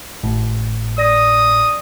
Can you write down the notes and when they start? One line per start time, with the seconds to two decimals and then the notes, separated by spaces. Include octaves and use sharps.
0.23 G#1 A2
0.98 D5 D#6 A#6